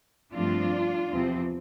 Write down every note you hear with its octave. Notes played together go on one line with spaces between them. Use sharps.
G2 F3 A3 C4 D4 F4
E2 C3 F3 C4